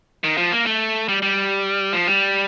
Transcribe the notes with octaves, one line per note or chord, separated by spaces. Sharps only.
D#3
F3
A#3
A3
G3
G3
F3
G3